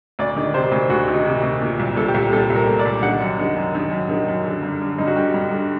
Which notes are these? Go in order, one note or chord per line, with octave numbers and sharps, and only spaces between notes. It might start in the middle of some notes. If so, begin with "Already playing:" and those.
D2 D5
D#3
C3 C5
D2
D2 F#4
D#3
D#4
C3
D2
A#2
C2
A#2 A4
G4
C2
A#2 A4
C2
A#4
A#2
D5
C2
D#3 F#5
F#2
D#3
F#2
D#3
F#2
D#3
F#2
D3
G2
D3
G2 D#4
F#4
D3 G4
G2
D3